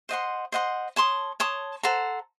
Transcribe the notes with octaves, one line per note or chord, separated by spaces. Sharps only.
C5 D#5 F#5 C6
C5 D#5 F#5 C6
C#5 A5 C6 D#6
C#5 A5 C6 D#6
A4 C5 F#5 A#5